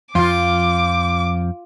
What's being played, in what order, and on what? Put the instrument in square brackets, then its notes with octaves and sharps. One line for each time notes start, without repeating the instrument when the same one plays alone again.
[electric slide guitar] F2 F3 [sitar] F4 [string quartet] D6